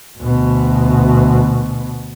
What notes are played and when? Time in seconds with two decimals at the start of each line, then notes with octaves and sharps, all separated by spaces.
0.19 D2 B2